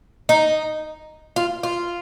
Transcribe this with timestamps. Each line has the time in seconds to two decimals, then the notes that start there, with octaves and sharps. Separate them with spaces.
0.29 D#4
1.36 F4
1.63 F4